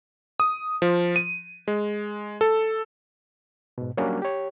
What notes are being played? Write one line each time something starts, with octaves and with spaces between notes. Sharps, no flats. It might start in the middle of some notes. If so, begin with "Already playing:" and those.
D#6
F3
D#7
G#3
A4
G#2 B2
F#3 G3 A#3 C#4 D4
G4 C#5